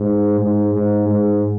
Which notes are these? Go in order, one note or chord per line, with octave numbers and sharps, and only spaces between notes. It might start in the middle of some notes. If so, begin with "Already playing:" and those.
Already playing: G#2
G#2
G#2
G#2